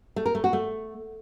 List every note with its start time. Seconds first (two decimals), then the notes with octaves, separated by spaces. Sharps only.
0.16 A3
0.26 A#4
0.35 A3
0.44 F#4
0.53 A3